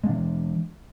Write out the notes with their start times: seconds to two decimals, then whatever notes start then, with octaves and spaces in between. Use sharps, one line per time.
0.04 G#3
0.06 D4
0.09 E3